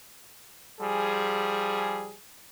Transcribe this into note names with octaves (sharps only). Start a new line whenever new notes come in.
F3 G3 G#4